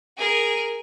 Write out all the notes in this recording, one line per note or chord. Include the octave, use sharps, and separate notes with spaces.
G#4 A#4